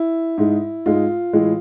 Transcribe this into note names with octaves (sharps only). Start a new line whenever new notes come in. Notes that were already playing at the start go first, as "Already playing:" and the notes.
Already playing: E4
G#2 G#3
G#2 G#3 F4
A2 E3 G#3